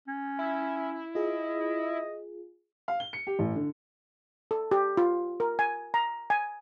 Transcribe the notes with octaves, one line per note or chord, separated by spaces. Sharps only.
C#4
E4
F4 G#4 D#5
F5
G7
C#7
G4
A1
D3
A4
G4
F4
A#4
G#5
A#5
G#5